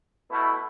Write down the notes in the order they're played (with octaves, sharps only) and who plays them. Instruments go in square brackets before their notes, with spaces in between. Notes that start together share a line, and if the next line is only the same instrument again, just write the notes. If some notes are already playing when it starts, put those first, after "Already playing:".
[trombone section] B2 A3 E4